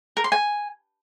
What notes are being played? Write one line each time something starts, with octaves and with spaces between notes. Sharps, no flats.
A#4
C6
G#5